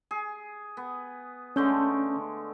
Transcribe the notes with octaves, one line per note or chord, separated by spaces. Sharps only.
G#4
B3
D3 G#3 A3 C#4 G6